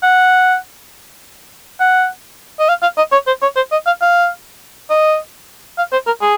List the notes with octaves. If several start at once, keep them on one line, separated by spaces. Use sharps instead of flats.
F#5
F#5
D#5
F5
F5
D#5
C#5
C5
C#5
C5
D#5
F5
F5
D#5
F5
C5
A#4
G#4